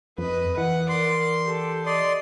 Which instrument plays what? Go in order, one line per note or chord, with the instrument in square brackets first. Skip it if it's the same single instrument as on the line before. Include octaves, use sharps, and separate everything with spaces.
[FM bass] F2 [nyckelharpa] B4 D#5
[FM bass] E3 [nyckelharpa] F#5
[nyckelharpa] A#4 D5 [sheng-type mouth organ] C6
[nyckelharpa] G4 A4
[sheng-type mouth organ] D5 C6 [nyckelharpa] D#5